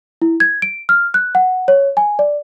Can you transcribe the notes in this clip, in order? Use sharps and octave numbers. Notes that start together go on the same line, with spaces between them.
E4
G#6
D7
F6
F#6
F#5
C#5
G#5
D5